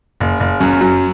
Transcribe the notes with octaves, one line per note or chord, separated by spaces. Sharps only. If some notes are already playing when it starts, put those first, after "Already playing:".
F#1
F#1
F#2
F#3